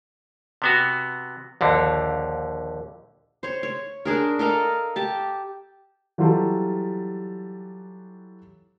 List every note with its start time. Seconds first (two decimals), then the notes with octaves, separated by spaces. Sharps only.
0.62 C3 B3 F#4
1.61 A#1 D#2 D3
3.43 C5 C#5
3.63 C#5
4.05 D4 G#4 A#4
4.39 A4 A#4 D#5 F5
4.96 G4 A5
6.18 E3 F#3 G3 F4 G4 A4